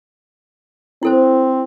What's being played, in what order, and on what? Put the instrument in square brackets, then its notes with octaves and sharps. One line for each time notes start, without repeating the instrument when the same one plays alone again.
[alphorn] C4 [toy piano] E4 A4 C5